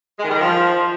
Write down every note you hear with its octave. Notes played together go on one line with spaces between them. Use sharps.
G#3
D#3
G3
D#3
F3